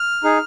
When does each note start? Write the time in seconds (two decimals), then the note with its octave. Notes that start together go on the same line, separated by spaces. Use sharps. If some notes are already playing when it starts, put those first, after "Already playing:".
Already playing: F6
0.24 D#4 G#4